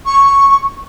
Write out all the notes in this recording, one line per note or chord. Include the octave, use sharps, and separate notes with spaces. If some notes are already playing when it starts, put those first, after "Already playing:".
C#6